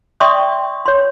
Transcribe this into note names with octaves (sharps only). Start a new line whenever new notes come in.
D5 E5 G5 C6 C#6 D#6
C#5 C6